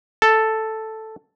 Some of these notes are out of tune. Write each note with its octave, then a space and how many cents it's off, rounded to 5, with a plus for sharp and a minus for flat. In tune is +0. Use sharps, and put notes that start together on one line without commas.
A4 +0